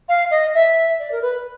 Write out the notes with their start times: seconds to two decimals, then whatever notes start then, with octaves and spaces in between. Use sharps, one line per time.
0.09 F5
0.31 D#5
0.54 E5
0.99 D5
1.11 A#4
1.21 B4